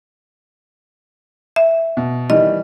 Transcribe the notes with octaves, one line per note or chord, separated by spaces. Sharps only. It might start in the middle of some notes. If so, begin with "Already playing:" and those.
E5
B2
D#3 E3 G3 D#5